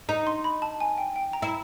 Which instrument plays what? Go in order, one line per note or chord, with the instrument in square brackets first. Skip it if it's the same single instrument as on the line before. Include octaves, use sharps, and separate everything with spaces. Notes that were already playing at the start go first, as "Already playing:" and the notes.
[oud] D#4 [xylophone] A#5
[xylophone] C6
B5
A5
G#5
G5
G5
A#5
[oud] E4